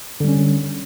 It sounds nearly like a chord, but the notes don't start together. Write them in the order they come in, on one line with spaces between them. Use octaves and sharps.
D3 G3 C#4